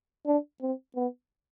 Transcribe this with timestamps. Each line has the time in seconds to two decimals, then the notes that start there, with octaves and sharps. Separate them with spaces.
0.27 D4
0.62 C4
0.96 B3